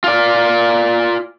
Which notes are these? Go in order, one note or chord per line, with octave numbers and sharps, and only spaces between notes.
F4 D5